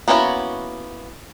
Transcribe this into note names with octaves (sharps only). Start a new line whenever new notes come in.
A#3 B3 C#4 E4 F#4